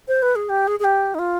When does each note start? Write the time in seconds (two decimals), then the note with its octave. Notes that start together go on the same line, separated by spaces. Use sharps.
0.08 C5
0.22 B4
0.36 G#4
0.49 G4
0.67 G#4
0.80 G#4
0.84 G4
1.15 D#4
1.19 F4